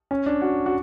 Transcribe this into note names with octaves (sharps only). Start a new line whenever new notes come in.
C#4
D4
F#4
F#4